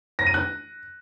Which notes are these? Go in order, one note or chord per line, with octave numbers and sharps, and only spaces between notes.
A#6
D#7
F#6